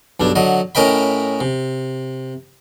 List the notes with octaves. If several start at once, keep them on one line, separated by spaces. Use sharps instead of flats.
B1 G2 D4
D3 F#3 D#5
A2 C#4 A#4 D#5 G5 B5
C3